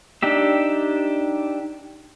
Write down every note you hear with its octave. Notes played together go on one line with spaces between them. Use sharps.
D4 D#4 G4 E5